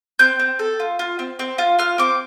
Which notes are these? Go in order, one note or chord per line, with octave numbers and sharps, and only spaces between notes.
C4 G6
C4
A4
F4
F4
C4
C4
F4
F4 F6
C4 D6